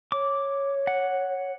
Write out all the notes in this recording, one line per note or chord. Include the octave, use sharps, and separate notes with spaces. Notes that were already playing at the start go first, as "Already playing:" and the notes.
C#5 D6
F#5